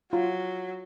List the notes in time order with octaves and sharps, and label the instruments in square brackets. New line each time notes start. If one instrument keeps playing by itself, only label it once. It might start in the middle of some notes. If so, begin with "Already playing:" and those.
[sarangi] F#3 [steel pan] F4